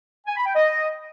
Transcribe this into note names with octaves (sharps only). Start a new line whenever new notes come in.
G#5
B5
G5
D#5